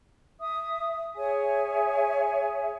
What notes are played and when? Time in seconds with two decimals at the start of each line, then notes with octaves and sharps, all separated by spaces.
0.39 E5 D#6
1.16 G#4 C#5 E5 G#5